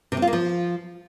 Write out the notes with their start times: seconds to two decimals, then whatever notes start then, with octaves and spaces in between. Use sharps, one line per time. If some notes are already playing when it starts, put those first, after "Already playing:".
0.12 C3
0.17 C4
0.22 F4
0.27 A#3
0.33 F3